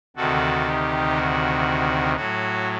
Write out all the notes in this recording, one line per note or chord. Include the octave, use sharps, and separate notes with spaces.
D2 C3 D#3 F#4 A4
D#4 G4
F#4
A2 F#3 F#4